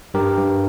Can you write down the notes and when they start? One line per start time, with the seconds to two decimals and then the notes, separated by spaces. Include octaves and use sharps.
0.14 G2 G4 A#4
0.38 G2